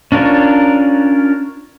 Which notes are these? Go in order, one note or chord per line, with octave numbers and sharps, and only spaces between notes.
C#4 D4 F4 A#4 C#5